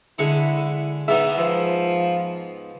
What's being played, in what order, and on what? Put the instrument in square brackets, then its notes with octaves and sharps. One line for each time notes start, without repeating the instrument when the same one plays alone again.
[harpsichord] D3 G#3 C#6 [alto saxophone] E4
[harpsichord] G#2 B3 D#4 [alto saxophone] E5
[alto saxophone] F3